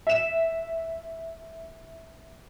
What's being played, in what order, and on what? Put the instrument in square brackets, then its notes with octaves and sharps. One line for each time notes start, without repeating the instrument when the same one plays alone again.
[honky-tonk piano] E5 E7